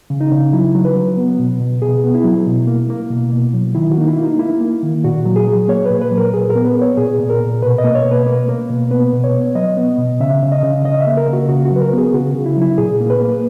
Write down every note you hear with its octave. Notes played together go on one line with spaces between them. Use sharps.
C#3
D#4
C#3
F#3 E4
F#3
B4
F#3
B3
B2
B2
B2 G#4
B3
E4
F#3
B2
A#3
A#3
B2
B2
F#3
D#3 E4
F#4
A#3 D#4
E4
A#3
D#4
A#3 E4
A#3
D#3
A#2 F#4
F#3
G#4
F#3
A#3 C#5
A#2 B4
B4
F#3
A#4
A#2 G#4
A#4
B3
B4
B3
C#5
A#2 G#4
A#2
A#4
A#2
B2 B4
D#5
A#3
C#5
B2
B4
A#3
A#3
B2
B3 B4
B2
C#5
B3
F#3 D#5
B3
B2
C#3 E5
C#3
D#5
C#3
C#3 D#5
E5
A#3
A#4
C#3 F#4
C#3 F#4
F#4
F#3
B4
A#4
B3 G#4
C#3 F#4
C#3
E4
F#3 E4
A#2 G#4
A#3
B4
A#3